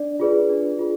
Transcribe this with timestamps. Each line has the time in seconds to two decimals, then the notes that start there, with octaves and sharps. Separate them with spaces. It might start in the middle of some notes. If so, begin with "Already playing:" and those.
Already playing: D4 D5
0.20 F4 G#4 B4 D5
0.50 D4
0.79 F4 G#4